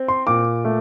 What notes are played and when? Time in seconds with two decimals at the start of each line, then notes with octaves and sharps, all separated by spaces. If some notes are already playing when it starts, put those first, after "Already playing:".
Already playing: C4
0.08 C6
0.27 A#2 D6
0.65 A3